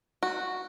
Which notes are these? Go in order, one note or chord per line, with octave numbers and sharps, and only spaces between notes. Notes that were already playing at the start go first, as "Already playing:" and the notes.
F#4